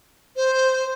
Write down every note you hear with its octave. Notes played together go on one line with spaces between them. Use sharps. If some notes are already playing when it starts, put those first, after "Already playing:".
C5